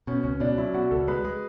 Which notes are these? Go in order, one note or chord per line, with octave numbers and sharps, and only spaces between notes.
B2 C#4
C#2 C#4
B2 D4
F#3 E4
B2 F#4
C#2 A4
G#3 B4
G#3